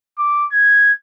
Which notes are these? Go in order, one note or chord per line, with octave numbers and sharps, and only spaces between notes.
D6
G#6